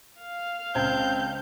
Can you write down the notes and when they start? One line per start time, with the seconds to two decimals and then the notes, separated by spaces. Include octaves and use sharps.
0.20 F5
0.75 C#2 C4 A5 G6 G#6